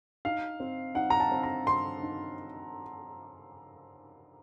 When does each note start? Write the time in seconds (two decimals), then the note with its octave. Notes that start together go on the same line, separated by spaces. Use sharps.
0.25 D#4 F5
0.60 C4
0.95 D#4 F#5
1.10 A#5
1.20 A5
1.31 C4
1.43 A#5
1.67 C4 C6
2.03 D#4